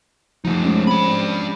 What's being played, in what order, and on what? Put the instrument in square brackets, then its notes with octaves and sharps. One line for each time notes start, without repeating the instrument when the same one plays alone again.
[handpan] F3 [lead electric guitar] A3 D#4
[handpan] G#3 C#4
[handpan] C4 [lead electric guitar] D4 B5